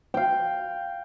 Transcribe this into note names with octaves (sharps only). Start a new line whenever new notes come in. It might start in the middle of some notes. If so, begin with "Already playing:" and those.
F5 G5